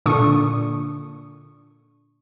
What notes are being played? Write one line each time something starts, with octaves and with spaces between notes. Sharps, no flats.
A#2 D3 D4 C#6 D#6